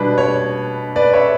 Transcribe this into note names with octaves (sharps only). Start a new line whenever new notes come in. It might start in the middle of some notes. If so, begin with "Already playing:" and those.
Already playing: B2 G3 D4 B4
C#5
B4 D5
C#5 E5